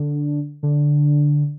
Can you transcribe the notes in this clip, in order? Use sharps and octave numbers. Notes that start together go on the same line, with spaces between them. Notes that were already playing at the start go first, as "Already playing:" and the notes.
Already playing: D3
D3